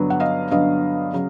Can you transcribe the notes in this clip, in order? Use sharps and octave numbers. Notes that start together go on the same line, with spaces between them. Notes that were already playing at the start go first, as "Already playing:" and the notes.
Already playing: G2 D3 F#3 B3
F#5
D#5 F5
G2 D3 F#3 B3 D#5 F5
C#3 F#3